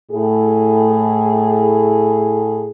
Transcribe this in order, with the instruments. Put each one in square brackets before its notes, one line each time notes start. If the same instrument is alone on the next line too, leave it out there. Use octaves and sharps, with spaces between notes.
[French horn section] A2 G#4